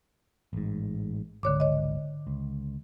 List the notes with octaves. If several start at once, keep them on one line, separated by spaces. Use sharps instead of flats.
A1 G#2
G#1 C#2 D3 C#5 D6
C#5 D#5
C#2